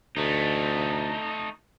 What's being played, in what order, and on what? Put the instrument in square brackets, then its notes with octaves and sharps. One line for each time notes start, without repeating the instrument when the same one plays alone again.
[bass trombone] D2 [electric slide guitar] A3 D#4